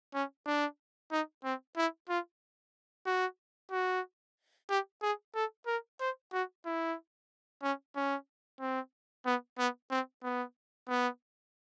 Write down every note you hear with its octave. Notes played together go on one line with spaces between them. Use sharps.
C#4
D4
D#4
C4
E4
F4
F#4
F#4
G4
G#4
A4
A#4
C5
F#4
E4
C#4
C#4
C4
B3
B3
C4
B3
B3